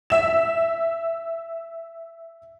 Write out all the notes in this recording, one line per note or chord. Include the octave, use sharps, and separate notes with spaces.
E5 E7